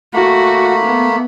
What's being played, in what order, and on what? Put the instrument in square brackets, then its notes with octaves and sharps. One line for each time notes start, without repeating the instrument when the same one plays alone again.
[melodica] A3 A#3 B5 [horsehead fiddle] F#4
[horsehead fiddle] B3